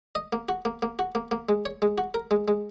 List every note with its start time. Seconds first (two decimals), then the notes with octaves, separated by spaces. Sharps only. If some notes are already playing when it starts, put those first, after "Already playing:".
0.15 D#5
0.33 A#3
0.49 F#4
0.65 A#3
0.82 A#3
0.99 F#4
1.15 A#3
1.31 A#3
1.49 G#3
1.65 C#5
1.82 G#3
1.98 F#4
2.14 A#4
2.31 G#3
2.48 G#3